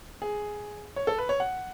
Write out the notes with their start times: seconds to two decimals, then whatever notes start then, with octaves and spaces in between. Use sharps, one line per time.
0.22 G#4
0.96 C#5
1.07 A4
1.18 B4
1.29 C#5
1.40 F#5